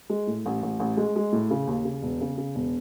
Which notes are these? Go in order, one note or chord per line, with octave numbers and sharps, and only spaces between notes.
G#3
A2
A1
A1
A1
G#3
G#3
A2
C#3
D#2
C#3
E1
C#3
C#3
E1